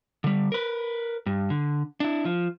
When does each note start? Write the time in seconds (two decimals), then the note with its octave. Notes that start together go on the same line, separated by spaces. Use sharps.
0.24 D3 G3
0.52 A#4 B4
1.26 G2
1.50 D3
2.00 D4 E4
2.25 F3